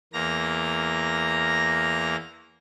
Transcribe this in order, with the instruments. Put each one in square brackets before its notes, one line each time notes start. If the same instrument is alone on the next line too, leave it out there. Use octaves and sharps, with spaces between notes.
[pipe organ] E2 A#3 A#5 A#6